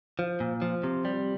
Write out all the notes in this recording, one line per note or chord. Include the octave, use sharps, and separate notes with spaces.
F3
A#2
F3
C3
G3